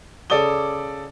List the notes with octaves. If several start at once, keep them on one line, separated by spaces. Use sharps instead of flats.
C#3 A4 D5 D6 D#6 G7